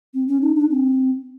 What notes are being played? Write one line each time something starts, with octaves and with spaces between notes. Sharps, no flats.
C4
C#4
D#4
D4
C4